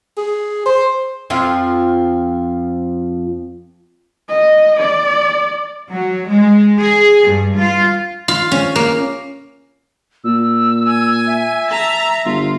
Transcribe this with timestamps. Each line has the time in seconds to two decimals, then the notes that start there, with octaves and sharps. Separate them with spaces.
0.17 G#4
0.66 C5
1.30 F2 F3 F4
4.29 D#5
4.80 D5
5.91 F#3
6.30 G#3
6.80 G#4
7.28 G2
7.58 F4
8.28 F4
8.52 C#4
8.76 A#3
10.24 A#2 E6
10.87 G#5
11.27 E5
11.70 A5 A#5
12.25 G1 F4